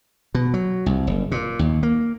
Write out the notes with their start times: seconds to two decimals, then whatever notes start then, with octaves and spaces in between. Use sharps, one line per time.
0.35 B2
0.54 F#3
0.86 C2
1.07 F#1
1.32 A#2
1.59 D#2
1.83 A#3